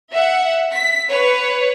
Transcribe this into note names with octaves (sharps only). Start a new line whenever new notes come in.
E5 F#5
B6
B4 C#5